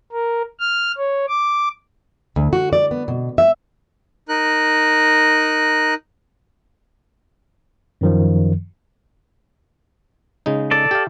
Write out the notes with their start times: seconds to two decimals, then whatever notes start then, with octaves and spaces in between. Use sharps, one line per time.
0.12 A#4
0.60 F6
0.98 C#5
1.28 D6
2.36 D2
2.53 F#4
2.73 D5
2.91 B3
3.08 B2
3.38 E5
4.29 D#4 A#4 F#6
8.01 F#2 D#3 F3
10.46 C#3 G#3 D#4
10.71 A4 D5
10.91 G4 F5